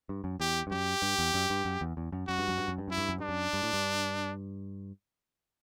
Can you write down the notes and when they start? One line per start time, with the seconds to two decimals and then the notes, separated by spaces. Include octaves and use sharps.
0.09 G2
0.24 F#2
0.40 E2 G4
0.67 G2
0.71 F#2 G4
1.02 G2
1.19 E2
1.34 F#2
1.50 G2
1.65 F#2
1.81 E2
1.97 E2
2.12 F#2
2.28 F#2 F#4
2.39 G2
2.48 F#2
2.58 G2
2.68 F#2
2.78 G2
2.88 F#2 E4
2.98 G2
3.09 F#2
3.18 G2 D4
3.29 F#2
3.53 G2
3.63 A2
3.73 G2